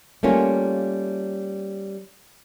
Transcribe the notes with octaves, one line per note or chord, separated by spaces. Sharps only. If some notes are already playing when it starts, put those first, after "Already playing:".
G3 A3 A#3 C#4 F4